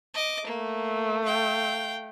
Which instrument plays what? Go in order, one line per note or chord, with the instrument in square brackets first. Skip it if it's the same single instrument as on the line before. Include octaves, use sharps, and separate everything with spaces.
[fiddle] D#5 D6
[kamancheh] A3 [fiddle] A#3
[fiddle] F5 G5